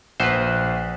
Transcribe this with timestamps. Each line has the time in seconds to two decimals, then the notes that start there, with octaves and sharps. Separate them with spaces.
0.20 A#1 B4 C5 F#5